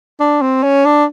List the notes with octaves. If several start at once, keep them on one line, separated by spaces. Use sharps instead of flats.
D4
C4
C#4
D4